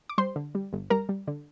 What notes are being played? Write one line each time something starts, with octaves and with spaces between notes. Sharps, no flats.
D6
G3 C5 C6
D3
G3
G1
G3 A#4 A#5
G3
D3